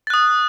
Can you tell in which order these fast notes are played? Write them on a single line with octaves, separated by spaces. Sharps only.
A6 F#6 D#6